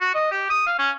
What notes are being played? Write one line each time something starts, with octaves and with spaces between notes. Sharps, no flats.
F#4
D#5
G4
D#6
F5
C#4